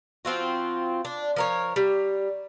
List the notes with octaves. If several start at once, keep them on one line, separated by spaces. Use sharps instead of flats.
F3 C4 F4 F#4
D4
F3 A#4 C#5
G3